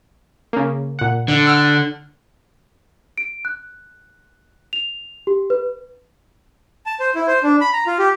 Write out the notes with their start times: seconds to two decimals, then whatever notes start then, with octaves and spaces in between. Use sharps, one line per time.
0.53 C#3 A#3
0.99 A#2 F#5
1.28 D3
1.45 F#5 E6 F6
3.18 D7
3.45 F#6
4.73 F7
5.27 G4
5.50 B4
6.86 A5
7.00 C5
7.15 E4
7.27 C5
7.43 D4
7.61 B5
7.73 A#5
7.87 F4
7.99 G4